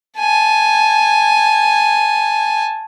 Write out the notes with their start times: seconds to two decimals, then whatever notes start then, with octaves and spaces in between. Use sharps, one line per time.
0.20 G#5 A5